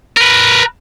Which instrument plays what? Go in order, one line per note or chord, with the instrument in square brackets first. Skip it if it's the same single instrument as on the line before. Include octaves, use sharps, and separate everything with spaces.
[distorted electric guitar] A#4 B4